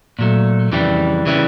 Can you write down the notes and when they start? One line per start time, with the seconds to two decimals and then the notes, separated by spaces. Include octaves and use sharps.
0.19 A#2 F#3 A3
0.71 F2 C#3 E3 G3
1.26 C#3 E3 G3